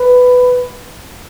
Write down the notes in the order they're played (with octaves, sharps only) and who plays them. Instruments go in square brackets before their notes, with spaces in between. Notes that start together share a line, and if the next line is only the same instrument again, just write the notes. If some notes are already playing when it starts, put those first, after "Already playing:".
Already playing: [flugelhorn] B4